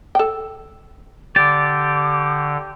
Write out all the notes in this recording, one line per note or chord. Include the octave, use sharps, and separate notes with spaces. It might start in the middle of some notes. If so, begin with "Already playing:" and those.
A4 G5
D3 G4 D5 D6